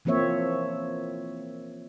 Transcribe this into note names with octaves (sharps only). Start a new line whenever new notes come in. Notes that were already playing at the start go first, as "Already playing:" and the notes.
E3 F3 A#3 C4 C#5 E5